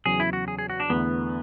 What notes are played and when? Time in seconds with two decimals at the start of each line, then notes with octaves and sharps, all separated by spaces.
0.05 E2 C#3 F#3 G#4
0.20 E4
0.33 F#4
0.48 G#4
0.59 G#4
0.70 F#4
0.80 D4
0.90 E2 D3 A3 B3 E4